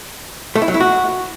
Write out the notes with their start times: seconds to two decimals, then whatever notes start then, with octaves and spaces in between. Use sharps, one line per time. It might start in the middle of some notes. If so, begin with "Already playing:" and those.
0.56 A3
0.62 E4
0.68 F#3
0.74 E4
0.80 F#4